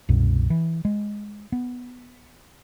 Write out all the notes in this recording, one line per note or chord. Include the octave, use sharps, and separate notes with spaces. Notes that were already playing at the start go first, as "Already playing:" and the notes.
C2 F#2 B2
E3
G#3
B3